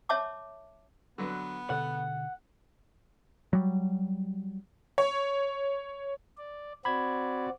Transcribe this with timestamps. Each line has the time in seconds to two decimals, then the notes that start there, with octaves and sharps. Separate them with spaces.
0.09 C#5 E5 A5 D6
1.18 D3 F#3 B3 B4
1.70 B2 D3 A4 F#5
3.53 F#3 G3
4.98 C#5
6.37 D5
6.85 C4 F#4 D5 B5 G#6